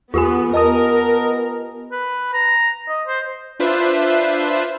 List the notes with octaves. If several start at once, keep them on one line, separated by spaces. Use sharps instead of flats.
E2 B3 F4 G4 G#5
B3 A#4 D#5 A5 D#6
B4
A#5
D#5
C5
D4 F4 B4 C5 E5